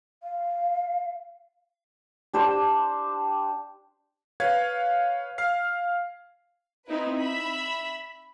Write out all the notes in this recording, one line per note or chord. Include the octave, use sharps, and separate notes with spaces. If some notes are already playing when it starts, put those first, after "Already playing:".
F5
D4 G4 C5
B4 C#5 F5 G#6
F5 F6 C7
C4 D#4 E4 B4
E5 B5